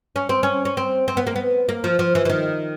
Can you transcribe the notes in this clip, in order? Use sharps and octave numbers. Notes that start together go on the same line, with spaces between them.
C#4
C4
C#4
C#4
C4
C4
B3
A#3
B3
A#3
F3
F3
E3
E3
D#3